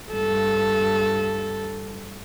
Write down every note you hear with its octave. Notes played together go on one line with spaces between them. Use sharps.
G2 A4